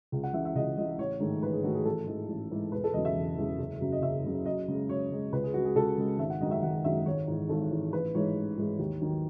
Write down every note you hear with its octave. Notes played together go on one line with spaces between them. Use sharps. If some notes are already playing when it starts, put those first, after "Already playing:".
C#2
F#5
C#3 E3 E5
E5
C#2 D#5
C#3 E3 D#5
A1 C#5
G#2 D#3 A3
A1 B4
G#4
G#2 D#3 A3 F#4
G#4
A1 A4
G#2 E3 G#3
A1
G#2 E3 G#3
E1 B4
A4
E2 C#3 F#3 D#5
E5
E1
E2 C#3 F#3
F#1
F#2 C#3 F#3
D#5
F#1 E5
F#2 C#3 F#3
F#2 D#5
C#3 G#3
F#2 C#5
C#3 G#3
C#2 B4
G#4
C#3 G#3 F#4
G#4
C#2 A4
C#3 G#3
G#1 E5
F#5
F#2 D#3 G#3 D#5
E5
G#1 F#5
F#2 D#3 G#3 E5
G#1 C#5
G#2 E3
G#1 A4
G#2 E3
A1 B4
G#2 E3 G#3 C#5
A1
G#2 E3 G#3
D#2
D#3 F#3